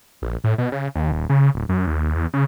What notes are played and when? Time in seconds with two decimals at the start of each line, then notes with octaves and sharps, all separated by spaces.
0.22 A#1
0.44 A2
0.58 B2
0.72 C#3
0.95 D#2
1.12 D#1
1.29 C#3
1.55 D1
1.69 F#2
1.87 D#2
2.15 E2
2.33 C#3